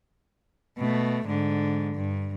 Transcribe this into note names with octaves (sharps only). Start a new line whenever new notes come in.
B2 A3
G#2 D3
G2